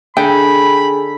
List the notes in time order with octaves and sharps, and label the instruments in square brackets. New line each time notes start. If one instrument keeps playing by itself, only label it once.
[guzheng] D3 D#4 [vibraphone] D4 G#4 G#5 [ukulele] G5 [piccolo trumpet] B5